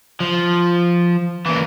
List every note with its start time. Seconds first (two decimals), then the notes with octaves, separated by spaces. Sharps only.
0.20 F3
1.46 A#2 E3